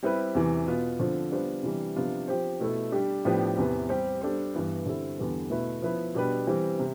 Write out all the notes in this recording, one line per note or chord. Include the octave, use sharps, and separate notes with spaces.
G3 C4 E4 G4 B4
E2 C3 E3
B2 B3 F4
D3 F3 C4 F4
G3 B3 D4 F4 C5
C3 E3 G3 D4
C3 F3 B3 D4 F4
F3 C4 G4 C5
B2 A3 E4 A4
G3 D4 G4
A2 F3 B3 D4 G4
E2 C3 E3 B3
G3 C4 G4 C5
G3 D4 A4 C5
G2 E3 B3
D3 G3 C4 E4 A4
E2 D3 G3 B3
B2 A3 E4 B4
F3 B3 E4 B4
B2 G3 D4 G4 B4
E3 G3 C4
C3